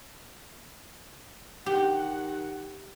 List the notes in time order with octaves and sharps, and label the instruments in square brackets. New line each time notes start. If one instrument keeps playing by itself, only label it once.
[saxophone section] D#3 F#5 [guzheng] G4